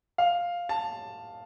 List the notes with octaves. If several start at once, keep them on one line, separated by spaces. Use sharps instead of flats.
F5
A5